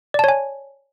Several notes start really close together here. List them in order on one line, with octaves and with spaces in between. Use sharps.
D5 A5 C#5 G#5